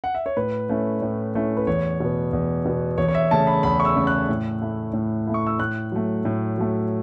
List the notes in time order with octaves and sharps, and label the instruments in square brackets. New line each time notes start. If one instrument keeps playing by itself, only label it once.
[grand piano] F#5
E5
C#5
A2 B4
A3 C#4 E4
A2
A3 C#4 E4
B4
E2 C#5
B2 B3
E2
B2 B3
E2 C#5
C#5
E5
C#3 A3 C#4 A5
B5
E2 B5
C#6
E6
C#3 A3 C#4
F#6
A2
A3 E4
A2
A3 E4
C#6
E6
A2 F#6
F#3 A3
A2
F#3 A3